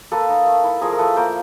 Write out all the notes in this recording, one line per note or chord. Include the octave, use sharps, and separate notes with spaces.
A#3 A4 B4
D#4
A3
E4
F3 G#4 A#4
A#4
A3 A4 B4
A#3 A#4 C5